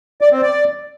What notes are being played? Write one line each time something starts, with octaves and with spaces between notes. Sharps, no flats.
D5
C4
D5